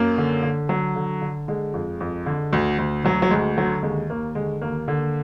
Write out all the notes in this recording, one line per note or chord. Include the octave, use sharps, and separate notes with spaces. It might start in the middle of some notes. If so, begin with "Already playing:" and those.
Already playing: F#2 A#3
D3
D3
D3 F#3
D3
D3
D3 G#3
F2
F2
D3
D2
D2
D2 F#3
F#3
D2 G#3
D3 F#3
D#2 G#3
D#2 A#3
D3 G#3
D#2 A#3
D3